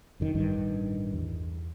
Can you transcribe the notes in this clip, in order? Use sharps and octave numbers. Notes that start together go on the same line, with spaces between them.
F1 F#2 D#3
A1 G2 D#3
E2